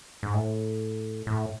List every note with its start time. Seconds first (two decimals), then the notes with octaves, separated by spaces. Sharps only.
0.23 G#2
0.34 A2
1.27 A2